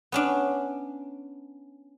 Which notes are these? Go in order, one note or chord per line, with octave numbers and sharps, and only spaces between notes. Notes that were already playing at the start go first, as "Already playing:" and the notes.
B3 C#4 D4